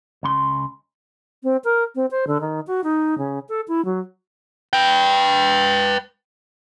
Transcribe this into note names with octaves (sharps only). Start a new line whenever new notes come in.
C#2 C#3 C6
C4
A#4
C4
C5
D3
D#3
F#4
D#4
C#3
A4
E4
F#3
B4 G5